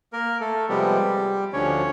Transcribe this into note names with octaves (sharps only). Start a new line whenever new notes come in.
A#3 A#4
A3 A4
C3 F3 G3 G#3 B3 G4
D2 D3 F3 C#4 C#5